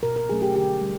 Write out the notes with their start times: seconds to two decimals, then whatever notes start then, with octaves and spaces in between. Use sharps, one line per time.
0.03 B2 A#4
0.16 A#4
0.30 F#3 A3 C#4 G#4
0.42 G4
0.55 D3 G4
0.82 G3